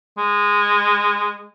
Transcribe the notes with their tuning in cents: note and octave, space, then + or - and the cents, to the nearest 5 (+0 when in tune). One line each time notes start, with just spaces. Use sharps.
G#3 -15